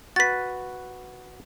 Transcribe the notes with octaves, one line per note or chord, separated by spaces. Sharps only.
F#4 B4 A6 B6